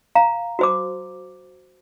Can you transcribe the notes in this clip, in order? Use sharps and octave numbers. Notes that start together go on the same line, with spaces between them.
F5 A#5
F#4 C5 D6